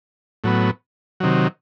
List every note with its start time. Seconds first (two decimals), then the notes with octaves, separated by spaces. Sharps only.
0.44 A2 F#3 B3
1.20 C3 D#3 F#3